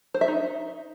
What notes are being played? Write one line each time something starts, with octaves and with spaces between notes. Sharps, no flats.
C5
E5
D#4